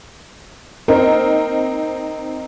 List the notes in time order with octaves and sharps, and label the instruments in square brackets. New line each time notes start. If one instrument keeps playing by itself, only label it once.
[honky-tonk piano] C4 D#4 [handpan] A#4